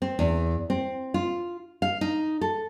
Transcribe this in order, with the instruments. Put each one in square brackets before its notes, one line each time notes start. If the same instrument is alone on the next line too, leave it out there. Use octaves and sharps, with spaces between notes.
[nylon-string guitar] C4
E2
C4
F4
F5
D#4
A4